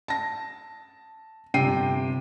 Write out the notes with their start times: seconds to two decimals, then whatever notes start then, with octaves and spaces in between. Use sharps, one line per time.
0.08 A5 A#6
1.54 G1 C3 G5 C7 D#7